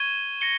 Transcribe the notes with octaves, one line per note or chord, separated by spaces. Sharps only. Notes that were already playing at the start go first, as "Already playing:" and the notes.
Already playing: C#6 G#6 D#7 G7
A#6 C#7 G7